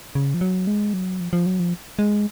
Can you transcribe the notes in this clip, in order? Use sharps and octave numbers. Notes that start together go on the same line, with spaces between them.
C#3
F3
F#3
G#3
F#3
F3
F3
F#3
F3
G#3